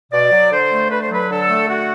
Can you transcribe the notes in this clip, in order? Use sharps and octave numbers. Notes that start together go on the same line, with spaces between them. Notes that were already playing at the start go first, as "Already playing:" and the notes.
B2 D5
F#3
D3 C5
A3
D3 B4
C5
F#3 B4
D3 A4
A3
D3 F#4